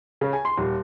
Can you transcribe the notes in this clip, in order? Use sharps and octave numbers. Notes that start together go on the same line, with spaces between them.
C#3
G#5
C6
D#1